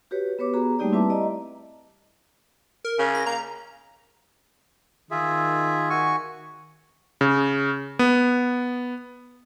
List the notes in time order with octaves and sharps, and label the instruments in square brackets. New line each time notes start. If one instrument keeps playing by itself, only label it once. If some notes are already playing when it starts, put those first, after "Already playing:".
[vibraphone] F#4 G4 B4 C#5
B3 B4 C#5 D6
B3 F#4 G#4 A#5
G3 A3 A#3 D#4 G4 D5
C4 E4 B4 E5 A5 D6
D5 D#5 A#5
[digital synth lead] A#4
[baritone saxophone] C#3
[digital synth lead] A#6
[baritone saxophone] A#3 [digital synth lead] A#5
[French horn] D#3 [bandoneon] F4 G#4 E5
[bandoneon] F#4 G#5 C#6
[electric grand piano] C#3
B3